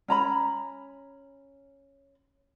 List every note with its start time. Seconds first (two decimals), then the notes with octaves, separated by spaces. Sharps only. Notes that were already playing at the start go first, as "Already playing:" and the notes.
0.08 C#4 A#5 B5